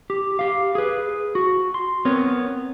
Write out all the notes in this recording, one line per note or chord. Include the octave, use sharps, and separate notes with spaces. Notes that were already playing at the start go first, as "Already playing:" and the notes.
G4
G4 F5
G#4 B4
F#4
C6
B3 C4 A#4 C#5